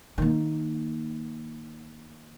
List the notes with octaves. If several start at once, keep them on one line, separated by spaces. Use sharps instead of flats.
D#3 A#3